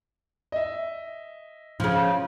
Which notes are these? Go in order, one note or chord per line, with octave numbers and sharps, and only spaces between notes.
D#5 E5
C#3 F3